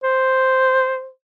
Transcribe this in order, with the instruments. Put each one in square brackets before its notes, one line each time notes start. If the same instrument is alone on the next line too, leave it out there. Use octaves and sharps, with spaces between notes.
[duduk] C5